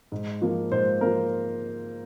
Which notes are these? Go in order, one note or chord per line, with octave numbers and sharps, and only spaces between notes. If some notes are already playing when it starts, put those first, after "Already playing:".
G#2
F3 A#3
G#2 C5
F3 A#3 A#4